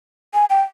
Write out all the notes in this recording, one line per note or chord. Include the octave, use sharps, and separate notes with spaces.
G#5
G5